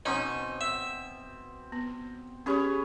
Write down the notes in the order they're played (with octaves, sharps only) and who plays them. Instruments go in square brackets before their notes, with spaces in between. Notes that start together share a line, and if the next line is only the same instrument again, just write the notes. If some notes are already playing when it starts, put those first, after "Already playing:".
[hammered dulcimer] B2 C4 D6 [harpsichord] C#4 D#4
[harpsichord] E5
[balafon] B3
[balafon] C#4 G4 C#6 [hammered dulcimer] G#4 B4 C#5